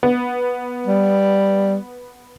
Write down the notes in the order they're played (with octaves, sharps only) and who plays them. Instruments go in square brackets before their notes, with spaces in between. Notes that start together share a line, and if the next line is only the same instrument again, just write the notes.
[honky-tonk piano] B3
[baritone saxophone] G3